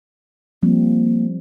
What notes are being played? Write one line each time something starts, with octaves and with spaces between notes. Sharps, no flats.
F3 G3 A#3 C4